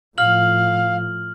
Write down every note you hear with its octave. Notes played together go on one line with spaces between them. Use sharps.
A2 F3 F5 F6 F#7